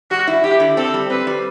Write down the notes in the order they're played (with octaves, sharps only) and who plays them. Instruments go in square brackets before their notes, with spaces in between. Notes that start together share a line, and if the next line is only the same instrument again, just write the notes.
[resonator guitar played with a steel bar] G3 [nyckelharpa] F#4
[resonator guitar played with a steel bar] E4
[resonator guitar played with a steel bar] E4 [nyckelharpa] G4
[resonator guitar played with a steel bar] D3
[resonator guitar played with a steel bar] C4 [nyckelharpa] A4
[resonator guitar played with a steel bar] G3
[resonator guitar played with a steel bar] C4 [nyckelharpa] B4
[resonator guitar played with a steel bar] G3